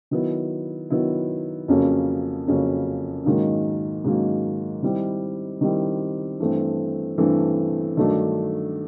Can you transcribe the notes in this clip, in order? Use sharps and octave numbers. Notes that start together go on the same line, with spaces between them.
D#3 F#3 B3 E4
D#3 F#3 B3 E4
F2 C#3 F#3 A#3 C#4
F2 C#3 F#3 A#3 C#4
G#2 D#3 F#3 A#3 C#4
G#2 D#3 F#3 A#3 C#4
D#3 G3 C4 E4
D#3 G3 C4 E4
G2 E3 A3 C4
G2 E3 A3 C4
G2 D#3 F#3 A3 D4